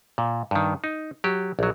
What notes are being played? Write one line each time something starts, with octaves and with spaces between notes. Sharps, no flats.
A#2
G2 D#3
D#4
F#3 G4
A#1 F#3